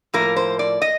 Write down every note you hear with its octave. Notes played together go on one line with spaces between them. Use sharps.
A2 F3 A#3 A#4
C5
D5
D#5